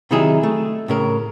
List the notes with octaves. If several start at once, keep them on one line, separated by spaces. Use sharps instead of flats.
C3 D#3 F#3 D#4 E4 G#4
A3
A2 C#3 A#4